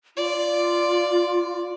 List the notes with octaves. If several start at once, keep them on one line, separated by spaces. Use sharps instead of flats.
F4 D5